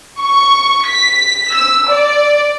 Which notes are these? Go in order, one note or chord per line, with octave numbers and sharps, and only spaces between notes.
C#6
B6
E6
D5